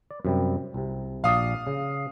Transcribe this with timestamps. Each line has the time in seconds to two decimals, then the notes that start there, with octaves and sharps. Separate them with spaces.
0.11 D5
0.25 F#2 C3 G3
0.74 C2 C3
1.24 A#1 D5 F5 D#6
1.67 C#3